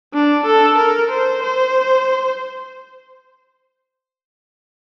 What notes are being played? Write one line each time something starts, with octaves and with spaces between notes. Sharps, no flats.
D4
A4
A#4
C5
C5